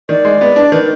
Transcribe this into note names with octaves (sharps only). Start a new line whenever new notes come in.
D#3 D5
G#3
B3
D4
D#3 B4